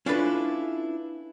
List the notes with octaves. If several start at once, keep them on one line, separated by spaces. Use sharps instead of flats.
C#4 D4 E4 F4 A4 B4